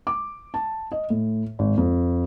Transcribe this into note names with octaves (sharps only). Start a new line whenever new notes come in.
D6
A5
D#5
A2
G#1
F2